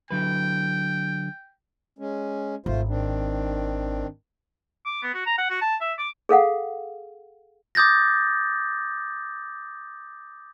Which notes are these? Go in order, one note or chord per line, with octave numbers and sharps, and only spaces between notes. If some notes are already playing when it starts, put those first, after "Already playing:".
D3 F#3 B4 G5
G#3 C#4
G#1 A3 F4 C5
D#3 C4 D4
D6
B3
F#4
A#5
F#5
F#4
A5
E5
D6
G#4 A4 F5 F#5
D6 D#6 G6 A6 A#6